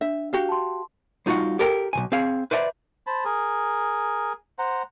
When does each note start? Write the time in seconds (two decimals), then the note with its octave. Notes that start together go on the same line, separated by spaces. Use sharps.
0.01 D4 E5
0.33 F#4 G4 F5
0.49 A5 C6
1.26 G3 D#4 F4 F#4 F#5
1.59 G4 A4 A#4 G5 A#5
1.93 B1 A#2 G#5
2.12 C4 G#4 F5
2.51 B4 C5 D5 E5 G#5 A#5
3.07 C5 A5 B5
3.25 G#4 A#4
4.59 C5 F#5 A#5